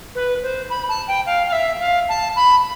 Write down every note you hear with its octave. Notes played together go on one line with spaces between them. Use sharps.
B4
C5
B5
A5
G5
F5
F5
E5
F5
A5
B5